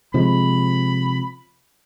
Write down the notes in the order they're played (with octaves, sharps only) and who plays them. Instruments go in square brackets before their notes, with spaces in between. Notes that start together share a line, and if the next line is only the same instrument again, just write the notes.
[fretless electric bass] C3 F3 G#3 [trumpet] B5